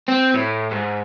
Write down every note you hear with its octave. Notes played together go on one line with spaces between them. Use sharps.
C4
A2
G#2